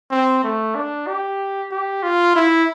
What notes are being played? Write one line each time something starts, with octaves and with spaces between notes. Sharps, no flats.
C4
A3
D4
G4
G4
F4
E4